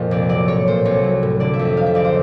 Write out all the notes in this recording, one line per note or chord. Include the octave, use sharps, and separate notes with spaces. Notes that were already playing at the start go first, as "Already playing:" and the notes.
Already playing: F2 A#2
C2 D5
F#3 D5
A2 C#5
A#2 C5
C2 C#5
F#3
A2
D3 D5
E5
F2
E5
C3 F5
E5
C#2 D5
C5